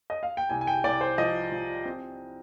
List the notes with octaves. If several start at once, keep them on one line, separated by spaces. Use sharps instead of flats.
D#5
F5
G5
C2 G#5
G#5
G5
C2 D5
C5
F3 D#5
F3
C4